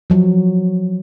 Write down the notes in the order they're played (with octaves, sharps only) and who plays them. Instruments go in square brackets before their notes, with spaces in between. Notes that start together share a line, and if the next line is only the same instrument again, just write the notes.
[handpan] F3 F#3